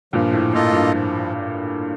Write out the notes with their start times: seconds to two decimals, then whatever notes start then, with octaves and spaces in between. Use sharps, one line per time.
0.13 G2 A#2 F3
0.33 A2
0.53 A2 A#3 F4 A4 D#5
0.73 G2 A#2
0.93 F3